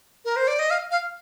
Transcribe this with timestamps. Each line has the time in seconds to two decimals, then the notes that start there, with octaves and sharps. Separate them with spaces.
0.25 A#4
0.36 C5
0.48 D5
0.59 D#5
0.71 F5
0.91 F5